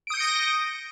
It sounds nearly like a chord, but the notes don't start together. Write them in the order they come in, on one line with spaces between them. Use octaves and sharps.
D7 D#6 G6 C#7 A#6